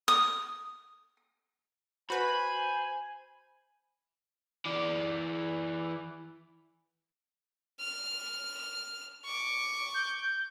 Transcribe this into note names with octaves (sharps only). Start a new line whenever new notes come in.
D#6
F#4 B4 C5 G#5 B5
E3 D5
F6
C#6 D6
G6